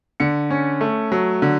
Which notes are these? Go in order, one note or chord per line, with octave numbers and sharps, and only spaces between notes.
D3 C#7
C#4
A3
F#3
D3